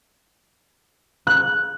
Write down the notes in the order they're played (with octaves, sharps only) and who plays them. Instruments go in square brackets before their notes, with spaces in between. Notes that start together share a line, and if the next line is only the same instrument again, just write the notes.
[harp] F#6